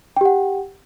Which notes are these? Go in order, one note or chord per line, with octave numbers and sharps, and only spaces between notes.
G4 F#5 G5